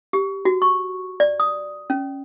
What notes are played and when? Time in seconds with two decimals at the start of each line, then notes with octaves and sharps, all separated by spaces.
0.13 G4
0.45 F#4
0.62 C#6
1.20 D5
1.40 D#6
1.90 C#4